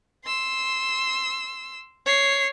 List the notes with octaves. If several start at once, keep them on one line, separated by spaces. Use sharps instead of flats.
C6 E6
C#5 C7